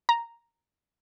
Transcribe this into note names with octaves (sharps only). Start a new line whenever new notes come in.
A#5